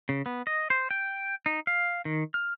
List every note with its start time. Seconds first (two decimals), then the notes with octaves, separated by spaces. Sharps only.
0.09 C#3
0.26 B3
0.47 D#5
0.70 C5
0.91 G5
1.46 D#4
1.67 F5
2.05 D#3
2.34 F6